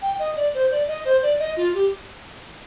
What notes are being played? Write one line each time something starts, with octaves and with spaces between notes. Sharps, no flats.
G5
D#5
D5
C5
D5
D#5
C5
D5
D#5
F4
G4